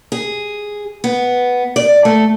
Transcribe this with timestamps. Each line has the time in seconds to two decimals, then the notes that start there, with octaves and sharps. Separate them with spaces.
0.12 G#4
1.04 B3
1.76 D5
2.05 A3